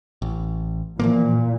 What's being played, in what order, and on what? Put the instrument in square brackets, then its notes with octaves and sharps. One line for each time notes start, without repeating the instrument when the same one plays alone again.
[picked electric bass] A1
[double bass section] A#2 [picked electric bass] E3 F3 A#3